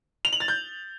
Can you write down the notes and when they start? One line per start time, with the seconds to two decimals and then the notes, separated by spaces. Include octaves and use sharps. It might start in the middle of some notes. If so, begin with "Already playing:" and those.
0.25 F7
0.33 F#7
0.40 A6
0.48 G6